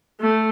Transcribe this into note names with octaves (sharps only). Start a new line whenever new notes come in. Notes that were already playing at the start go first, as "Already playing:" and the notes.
A3